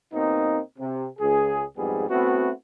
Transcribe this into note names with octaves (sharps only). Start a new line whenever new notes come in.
B2 A#3 C4 D#4
C3
C#2 G#4
C2 F2 G#2 G3 B3 G#4
A3 B3 C4 E4 F#4